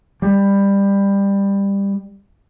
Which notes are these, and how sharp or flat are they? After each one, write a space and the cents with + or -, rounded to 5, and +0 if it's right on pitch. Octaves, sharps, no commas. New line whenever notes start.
G3 +20